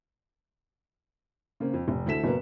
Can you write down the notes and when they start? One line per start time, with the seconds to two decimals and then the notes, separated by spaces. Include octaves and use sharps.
1.60 C#3 A#3 C4
1.74 F2
1.88 F1
2.06 D2 E4 A4 B6 E7
2.24 F#1 B2 A#3 B3